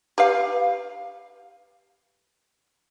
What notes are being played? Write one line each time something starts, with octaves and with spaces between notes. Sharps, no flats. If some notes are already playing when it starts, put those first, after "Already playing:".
G4 B4 F5